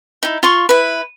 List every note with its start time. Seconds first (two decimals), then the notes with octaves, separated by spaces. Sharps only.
0.23 D#4 E4
0.43 F4 C6 C#6
0.69 E4 B4